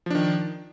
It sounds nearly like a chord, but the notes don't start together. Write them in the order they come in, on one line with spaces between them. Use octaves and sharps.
F3 D4 D#3